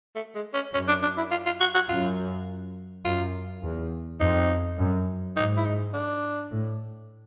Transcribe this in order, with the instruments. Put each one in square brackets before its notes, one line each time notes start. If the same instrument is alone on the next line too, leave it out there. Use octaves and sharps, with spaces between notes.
[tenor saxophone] A3
G#3
C#4
[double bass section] F#2 [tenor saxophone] C#4
[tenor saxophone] D4
D4
E4
F4
F4
F#4
F#4
[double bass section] F#2 [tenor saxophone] F4
[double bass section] F#2 [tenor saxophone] F4
[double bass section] E2
[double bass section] F2 [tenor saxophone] D#4
[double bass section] F#2
[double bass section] G#2 [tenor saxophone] D#4
[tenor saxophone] E4
D#4
D4
[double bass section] A2